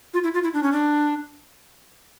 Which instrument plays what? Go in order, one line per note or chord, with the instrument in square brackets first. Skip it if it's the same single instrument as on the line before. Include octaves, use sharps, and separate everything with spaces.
[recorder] F4
E4
F4
E4
D4
C#4
D4